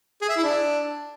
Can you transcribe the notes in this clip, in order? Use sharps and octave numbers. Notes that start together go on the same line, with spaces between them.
G#4
E5
E4
D4